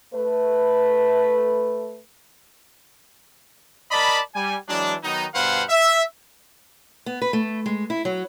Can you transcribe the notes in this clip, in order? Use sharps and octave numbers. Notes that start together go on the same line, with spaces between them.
A3 B4
A#4 D5 D#5 A5 B5
G3 G#5
E3 F#3 G#3 D4
D#3 F#3 B3 D#4
G2 B2 B4 C5 F5 F#5
E5
B3
B4
A3
G#3
E4
F#3